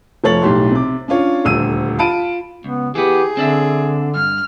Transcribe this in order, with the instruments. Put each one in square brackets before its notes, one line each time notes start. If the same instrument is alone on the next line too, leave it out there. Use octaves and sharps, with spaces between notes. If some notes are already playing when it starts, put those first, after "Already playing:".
[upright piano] F1 F3 A3 C#5 A6 F#7
B1 A2 G4 C6
C3 D6
C#4 D4 F4 C#5
D#1 D2 E6 D#7
F4 A5 B5 D7 D#7
[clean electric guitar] C#2 [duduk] B3
[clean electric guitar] E3 B3 [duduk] G4 [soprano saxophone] G#4
[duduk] D3 [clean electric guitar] C4 D4 E5
[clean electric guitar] G2 [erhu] F6